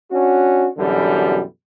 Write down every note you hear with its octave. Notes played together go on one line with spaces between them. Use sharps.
C#4 D4 F#4
F#2 B2 D3 E3 G3